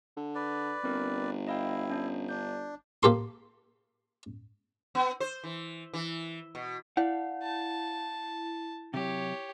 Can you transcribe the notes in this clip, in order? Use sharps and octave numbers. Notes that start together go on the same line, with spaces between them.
D3
B4 D5
G1 C4 A#4
E4 D#5 F5 G5
C#4 D4
D4 G6
A#3 G4 A4 C6
B3
C5
E3
E3
B2
E4 D5 F5 F#5
A5
C3 F#3 G4 C#5